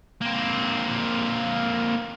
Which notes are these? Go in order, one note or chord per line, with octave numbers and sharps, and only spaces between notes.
A#3 C4